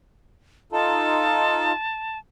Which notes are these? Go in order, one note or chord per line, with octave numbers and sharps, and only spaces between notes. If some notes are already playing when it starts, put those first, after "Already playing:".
D#4 F4 A4 A5